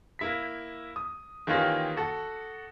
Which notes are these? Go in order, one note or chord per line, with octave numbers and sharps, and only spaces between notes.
A#3 E4 B6
D#6
D#3 E3 A#3 C#4 F4 G4
F#4 A4 F#5